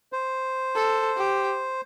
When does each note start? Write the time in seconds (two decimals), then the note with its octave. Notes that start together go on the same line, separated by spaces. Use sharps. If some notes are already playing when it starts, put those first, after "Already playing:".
0.13 C5
0.76 A4
1.17 G4